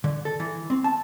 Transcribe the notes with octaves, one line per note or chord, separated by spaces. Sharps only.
D3
A4
E3
C4
A5